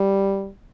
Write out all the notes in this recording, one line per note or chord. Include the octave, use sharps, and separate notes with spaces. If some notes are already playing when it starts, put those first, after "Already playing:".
Already playing: G3